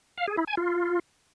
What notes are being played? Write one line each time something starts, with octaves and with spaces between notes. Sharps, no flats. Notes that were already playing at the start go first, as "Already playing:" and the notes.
F5
G#4
E4
G#5
F4